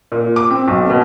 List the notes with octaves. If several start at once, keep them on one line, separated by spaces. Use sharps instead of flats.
A#2
D6
C4
B1
B2